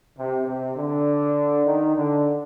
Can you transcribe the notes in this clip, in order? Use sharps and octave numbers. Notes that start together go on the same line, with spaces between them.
C3
C3
D3
D#3
D3